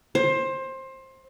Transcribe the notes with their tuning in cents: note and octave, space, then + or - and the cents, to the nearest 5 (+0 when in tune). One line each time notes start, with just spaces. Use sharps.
C5 +20